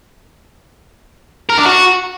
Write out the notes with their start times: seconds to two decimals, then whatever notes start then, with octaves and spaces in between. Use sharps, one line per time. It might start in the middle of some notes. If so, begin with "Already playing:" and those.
1.49 A#4
1.57 D4
1.65 F#4